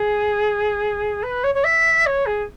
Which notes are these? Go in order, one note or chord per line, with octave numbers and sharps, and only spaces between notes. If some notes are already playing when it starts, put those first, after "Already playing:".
Already playing: G#4
B4
C#5
C#5
E5
C#5
G#4